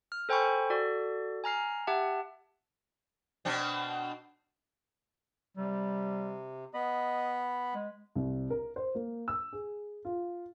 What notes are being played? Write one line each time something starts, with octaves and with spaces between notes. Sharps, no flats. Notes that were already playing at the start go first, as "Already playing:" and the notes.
F6
A4 C5 G5 G#5 B5 C#6
F#4 A4 D5
G#5 A#5 F6 C7
G4 E5 F#5 A5
B2 C4 D4
C3 G3
B3 D#5 B5
G#3
C2
A#4
C5
A#3
E6
G#4
F4